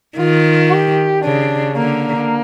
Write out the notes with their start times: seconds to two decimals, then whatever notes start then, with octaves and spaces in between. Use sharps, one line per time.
0.18 D#3 F4
0.71 G4
1.24 C#3 D4
1.77 D3 A#3